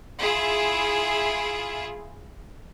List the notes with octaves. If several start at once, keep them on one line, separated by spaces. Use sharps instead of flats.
E4 F4 G#4